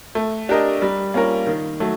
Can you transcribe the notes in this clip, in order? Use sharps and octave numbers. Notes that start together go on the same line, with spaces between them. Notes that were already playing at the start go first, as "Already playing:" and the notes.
A3
D4 G4 A#4 D#5
G3
A#3 C#4 F4 A#4
D#3
F#3 A3